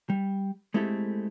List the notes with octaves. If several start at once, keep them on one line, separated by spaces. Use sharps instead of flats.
G3
G#3 A3 C4 E4 G4 A4